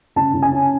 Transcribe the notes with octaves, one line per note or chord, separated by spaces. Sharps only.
C#3 A5
C#3
G#5
C#4